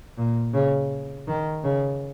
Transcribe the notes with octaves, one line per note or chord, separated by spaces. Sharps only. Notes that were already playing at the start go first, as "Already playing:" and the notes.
A#2
C#3
D#3
C#3